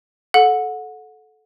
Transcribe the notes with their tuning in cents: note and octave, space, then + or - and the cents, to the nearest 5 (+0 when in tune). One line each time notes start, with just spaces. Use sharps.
A4 -20 F#5 -25